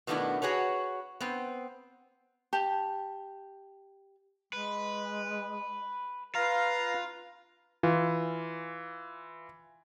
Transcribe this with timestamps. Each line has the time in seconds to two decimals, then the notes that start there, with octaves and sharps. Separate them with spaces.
0.07 B2 D#3 A3 B3 D4 E4
0.42 F#4 G#4 B4 C#5
1.21 B3 C4
2.53 G4 A5
4.53 G#3 B4
6.35 F4 B4 F5 A#5
7.83 E3 F4